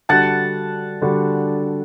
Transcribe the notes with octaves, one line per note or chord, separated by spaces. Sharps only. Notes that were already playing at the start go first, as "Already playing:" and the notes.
D3 G3 D4 F#4 F#5 A5
D3 G3 D4 F#4